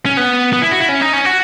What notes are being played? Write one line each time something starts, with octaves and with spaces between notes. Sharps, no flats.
C#4
B3
B3
E4
F#4
E4
C#4
D#4
C#4
F#4